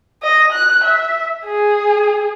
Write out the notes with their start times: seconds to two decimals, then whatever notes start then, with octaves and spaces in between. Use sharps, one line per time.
0.23 D#5
0.52 F#6
0.84 E5
1.46 G#4